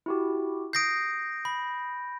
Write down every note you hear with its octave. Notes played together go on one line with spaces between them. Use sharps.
E4 F#4 G4
D#6 G6 A#6 C7 D7
B5